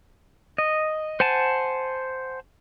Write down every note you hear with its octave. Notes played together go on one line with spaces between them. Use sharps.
D#5
C5 F#5 G#5 A5